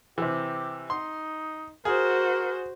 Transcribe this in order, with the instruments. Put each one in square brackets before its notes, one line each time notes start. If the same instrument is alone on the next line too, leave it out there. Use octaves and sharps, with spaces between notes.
[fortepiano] C3 E3 [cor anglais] G4
[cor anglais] D#4 [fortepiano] C6
[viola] F#4 C5 [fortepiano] G#4 [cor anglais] A#4